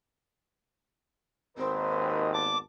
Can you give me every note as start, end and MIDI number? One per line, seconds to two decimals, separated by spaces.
1.58 2.58 32
1.58 2.58 39
1.58 2.42 60
1.58 2.28 70
1.58 2.28 71
1.58 2.28 75
2.33 2.57 59
2.33 2.57 74
2.33 2.57 81
2.33 2.58 86